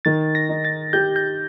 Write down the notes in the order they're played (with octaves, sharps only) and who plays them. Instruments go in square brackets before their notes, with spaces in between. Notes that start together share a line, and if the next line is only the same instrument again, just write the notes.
[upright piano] D#3 [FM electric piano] A6
[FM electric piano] A#6
[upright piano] D#4
[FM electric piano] A6
[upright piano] G4 [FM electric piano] G6
[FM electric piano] G6